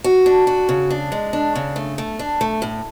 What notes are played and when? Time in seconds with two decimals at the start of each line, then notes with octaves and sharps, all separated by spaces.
0.04 F#4
0.26 D4
0.47 F#4
0.69 C#3
0.91 D4
1.12 G#3
1.33 D4
1.56 C#3
1.76 A3
1.98 A3
2.19 D4
2.41 A3
2.62 A2